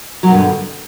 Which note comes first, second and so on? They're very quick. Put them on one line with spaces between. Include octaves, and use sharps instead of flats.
F#3 B2 G2 D3